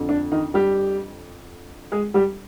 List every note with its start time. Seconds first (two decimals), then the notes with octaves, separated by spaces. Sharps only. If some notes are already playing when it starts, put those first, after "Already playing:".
Already playing: F2 D3
0.09 D4
0.32 D#3 D#4
0.54 G3 G4
1.92 G#3 G#4
2.14 G3 G4